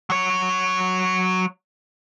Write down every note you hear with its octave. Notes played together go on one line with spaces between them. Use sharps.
F#3 C#5